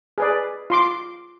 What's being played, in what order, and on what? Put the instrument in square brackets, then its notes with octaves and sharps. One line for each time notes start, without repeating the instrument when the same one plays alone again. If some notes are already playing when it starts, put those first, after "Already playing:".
[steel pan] G#4 B4 D5
F4 C6 D6